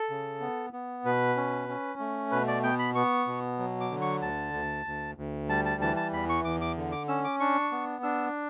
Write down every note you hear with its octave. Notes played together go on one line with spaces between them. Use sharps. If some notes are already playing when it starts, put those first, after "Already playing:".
Already playing: A4
C#3
B3
B3
B2 B4
C#4
C#4
A3
B2 B4
D5
B3 G5
B5
B3 C#6
B2
F#3
D6
D3
C#6
D2 A5
D2
D2
D2
G3 A5
A5
E3 A5
A5
E2 B5
C#6
E2 D6
D6
D3
D6
C#4 E6
D6
D4 C#6
B3
D4 E6